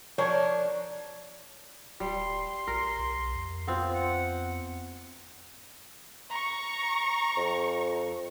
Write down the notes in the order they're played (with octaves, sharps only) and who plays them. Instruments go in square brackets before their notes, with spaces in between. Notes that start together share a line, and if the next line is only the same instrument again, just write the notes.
[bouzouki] F3 D4 A#4 [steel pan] C#5
[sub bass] D#1 [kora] G3 [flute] C6
[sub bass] A#1 [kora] A#4
[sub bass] B1
F2
[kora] B3 C4 F4
[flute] F#5
[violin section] A#5 C#6
[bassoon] F2